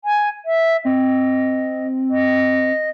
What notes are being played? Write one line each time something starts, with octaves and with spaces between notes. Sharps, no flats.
G#5
E5
C4 D#5
D#5